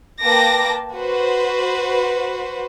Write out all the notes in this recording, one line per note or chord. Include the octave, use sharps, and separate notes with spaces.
A#3 B4 G5 A5 D6 A#6
F#4 B4 C5